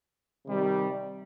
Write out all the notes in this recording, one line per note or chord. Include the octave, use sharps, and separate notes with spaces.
C3 D#3 G3